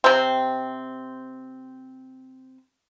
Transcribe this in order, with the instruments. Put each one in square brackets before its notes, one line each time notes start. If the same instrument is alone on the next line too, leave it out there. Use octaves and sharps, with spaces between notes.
[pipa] C3 C4